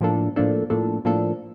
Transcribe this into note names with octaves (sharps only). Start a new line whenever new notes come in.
A2 F3 A#3 D4 A4
A2 F3 A#3 D4 A4
A2 F3 A#3 D4 A4
A2 F3 A#3 D4 A4